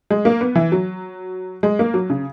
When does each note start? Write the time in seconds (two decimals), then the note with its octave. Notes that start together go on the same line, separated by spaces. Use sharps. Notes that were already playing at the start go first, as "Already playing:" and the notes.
0.10 G#3
0.25 A#3
0.41 B3
0.55 E3
0.72 F#3
1.63 G#3
1.79 A#3
1.94 F#3
2.10 C#3